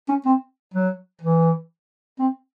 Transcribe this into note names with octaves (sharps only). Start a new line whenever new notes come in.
C#4
C4
F#3
E3
C4